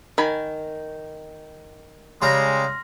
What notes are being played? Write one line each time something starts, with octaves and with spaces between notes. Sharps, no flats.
D#3 G#5 B5
C#3 G3 G#3 A#5 C6 F6 A#6